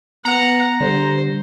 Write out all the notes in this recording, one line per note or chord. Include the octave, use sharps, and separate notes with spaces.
B3 F#5 A#5
D3 G3 C5